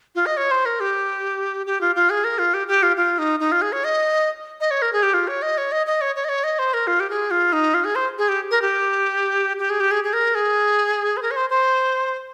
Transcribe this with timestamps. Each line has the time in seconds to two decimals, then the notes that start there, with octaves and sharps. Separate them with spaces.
0.15 F4
0.26 D#5
0.37 C#5
0.51 C5
0.66 A#4
0.80 G4
1.66 G4
1.81 F4
1.96 F4
2.10 G#4
2.24 A#4
2.39 F4
2.54 G4
2.68 G4
2.83 F4
2.97 F4
3.19 D#4
3.40 D#4
3.52 F4
3.62 G#4
3.72 C#5
3.84 D#5
4.60 D#5
4.71 C#5
4.82 A#4
4.93 G#4
5.03 G4
5.14 F4
5.28 C#5
5.42 D#5
5.58 C#5
5.72 D#5
5.87 D#5
6.01 C#5
6.16 C#5
6.24 D#5
6.29 C#5
6.44 D#5
6.59 C5
6.74 A#4
6.87 F4
7.00 G4
7.10 G#4
7.31 F4
7.53 D#4
7.74 F4
7.85 G#4
7.95 C5
8.18 G#4
8.29 G4
8.51 A#4
8.62 G4
9.58 G4
9.70 G#4
9.80 G4
9.91 G#4
10.04 G#4
10.13 A#4
10.35 G#4
11.17 C5
11.22 A#4
11.31 C#5
11.36 C5
11.50 C5